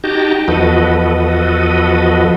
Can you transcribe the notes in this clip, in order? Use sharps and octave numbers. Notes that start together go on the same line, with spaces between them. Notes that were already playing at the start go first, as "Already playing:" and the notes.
D#4 F#4 G4 G5 A5 A#5
E2 F3 F#4 A4 B4 D#5